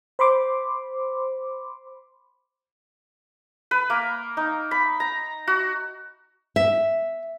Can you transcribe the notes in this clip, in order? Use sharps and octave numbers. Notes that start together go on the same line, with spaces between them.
C5 B5 C6 D6
B4
A#3
D#4
B5
A#5
F#4
E5